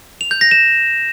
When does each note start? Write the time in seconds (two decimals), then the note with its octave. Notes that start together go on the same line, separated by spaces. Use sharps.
0.21 F7
0.31 G6
0.41 A#6
0.51 E7